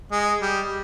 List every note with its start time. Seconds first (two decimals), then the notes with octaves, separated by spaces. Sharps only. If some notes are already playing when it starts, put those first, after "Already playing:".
0.12 G#3
0.42 G3